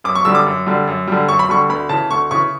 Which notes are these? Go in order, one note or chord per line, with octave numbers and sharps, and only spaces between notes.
F#2 D6
C#6
D3 G3 E6
D6
F#2
D3 G3
F#2
D3 G3
F#2 C#6
B5
D3 G3 C#6
D2 B5
C#3 E3 A5
D2 C#6
C#3 E3 C#6